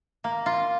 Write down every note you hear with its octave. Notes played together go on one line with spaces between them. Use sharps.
A#3
F4